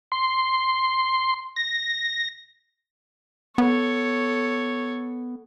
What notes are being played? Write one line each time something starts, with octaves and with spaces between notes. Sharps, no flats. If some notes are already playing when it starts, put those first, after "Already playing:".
C6
A#6
B3 A4 C#5